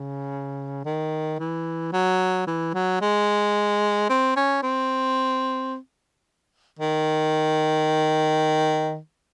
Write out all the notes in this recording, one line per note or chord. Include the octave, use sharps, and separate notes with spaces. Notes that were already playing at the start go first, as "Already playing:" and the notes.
Already playing: C#3
D#3
E3
F#3
E3
F#3
G#3
C4
C#4
C4
D#3